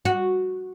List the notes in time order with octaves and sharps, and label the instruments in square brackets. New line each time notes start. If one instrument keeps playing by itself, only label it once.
[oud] F#4